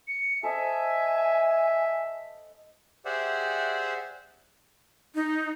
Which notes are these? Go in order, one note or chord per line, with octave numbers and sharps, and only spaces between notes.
C#7
A4 C5 D#5 E5 G#5
G4 G#4 C5 D5 E5 F#5
D#4